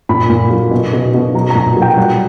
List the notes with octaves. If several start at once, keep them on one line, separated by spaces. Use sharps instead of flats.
A#2 B5
A#2
F#3
B2
B2
B2
F#3 A#5
A#5
A#2
F#3 G5
G3 F#5